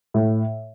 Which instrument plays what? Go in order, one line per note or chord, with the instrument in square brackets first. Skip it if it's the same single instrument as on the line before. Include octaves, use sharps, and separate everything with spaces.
[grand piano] A2